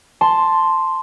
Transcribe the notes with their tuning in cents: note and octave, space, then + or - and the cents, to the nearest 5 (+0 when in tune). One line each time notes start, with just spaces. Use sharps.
A5 +0 C6 +0